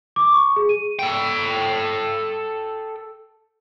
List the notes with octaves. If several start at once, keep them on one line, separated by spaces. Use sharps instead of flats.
D6
C#6
G#4
D#7
A4 G5